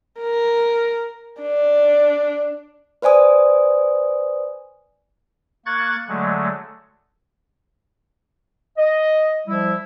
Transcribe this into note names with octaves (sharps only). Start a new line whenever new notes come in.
A#4
D4
B4 C5 D5 G#5 D#6
A#3 C#6 F#6 G#6 A6
D3 F#3 G#3 A3
D#5
F3 G3 E4